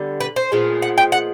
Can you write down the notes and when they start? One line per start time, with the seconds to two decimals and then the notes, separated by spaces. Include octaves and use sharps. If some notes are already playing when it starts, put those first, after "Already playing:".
Already playing: D3 G3 B3
0.20 B4
0.36 C5
0.52 A#2 F3 G#3 B3
0.82 F#5
0.98 G5
1.12 F#5